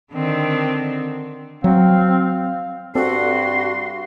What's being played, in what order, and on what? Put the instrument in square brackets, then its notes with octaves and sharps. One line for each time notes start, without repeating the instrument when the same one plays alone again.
[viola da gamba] D3 D#3 C4
[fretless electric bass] F#3 [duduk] C4 [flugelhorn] F5
[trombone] G2 [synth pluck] C4 A4 D5 [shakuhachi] F#4 [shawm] C6